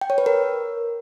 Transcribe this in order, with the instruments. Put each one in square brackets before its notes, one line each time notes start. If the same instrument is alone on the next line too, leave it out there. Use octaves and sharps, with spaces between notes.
[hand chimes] G5
C#5
B4
A#4